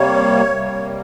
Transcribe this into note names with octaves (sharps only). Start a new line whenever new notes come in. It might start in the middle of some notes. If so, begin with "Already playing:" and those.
Already playing: C3 G3 A#3 C#5
C3 G3 A#3